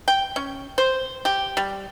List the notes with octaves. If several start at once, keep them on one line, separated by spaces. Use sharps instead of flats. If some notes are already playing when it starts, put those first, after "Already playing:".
G5
C#4
C5
G4
G3